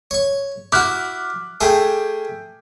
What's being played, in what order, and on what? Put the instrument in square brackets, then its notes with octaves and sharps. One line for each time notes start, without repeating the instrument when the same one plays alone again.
[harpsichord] C#5 C#6
[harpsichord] E4 F#4 [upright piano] D6 F6 F#6
[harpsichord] A3 G#4 [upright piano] G5 G#5